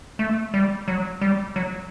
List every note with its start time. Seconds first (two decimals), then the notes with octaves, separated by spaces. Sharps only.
0.19 A3
0.54 G3
0.88 F#3
1.21 G3
1.56 F#3